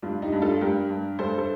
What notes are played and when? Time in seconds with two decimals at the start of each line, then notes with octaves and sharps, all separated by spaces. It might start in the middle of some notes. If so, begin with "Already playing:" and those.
0.02 G2 D4 F4
0.22 D#4 G4
0.32 G2
0.42 F4 A4
0.61 G2 G4 A#4
0.90 G2
1.18 G2 A4 C5
1.38 A4 C5